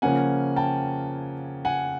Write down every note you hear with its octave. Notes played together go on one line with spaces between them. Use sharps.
C#3 F3 A#3 C#4 F#5 G#5
G5 A5
F#5 G#5